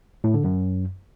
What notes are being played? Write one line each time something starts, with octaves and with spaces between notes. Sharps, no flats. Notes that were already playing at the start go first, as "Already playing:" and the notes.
A2
D3
F#2